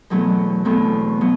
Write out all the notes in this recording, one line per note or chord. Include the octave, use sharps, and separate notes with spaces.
E2 B2 F#3 A3 C4
E2 B2 F#3 A3 C4
B2 F#3